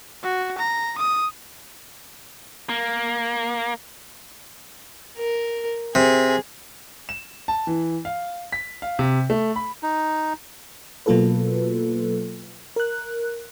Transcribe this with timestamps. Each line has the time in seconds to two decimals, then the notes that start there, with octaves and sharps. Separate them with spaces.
0.23 F#4
0.58 A#5
0.98 D#6
2.69 A#3
5.18 A#4
5.95 C3 G#4
7.09 E7
7.48 A5
7.67 E3
8.05 F5
8.52 B6
8.82 F5
8.99 C3
9.30 A3
9.56 B5
9.83 D#4
11.06 B2 F#3 A#3 F4 A4 B4
12.76 A#4 F#6